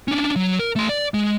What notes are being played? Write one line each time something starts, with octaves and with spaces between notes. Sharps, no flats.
C#4 D4
F#3
A#4
A3 C6
D5
G#3